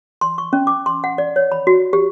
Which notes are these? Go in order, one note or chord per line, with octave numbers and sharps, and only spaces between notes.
C6
C#6
C#4
D6
C6
F#5
D5
C#5
B5
F#4
G4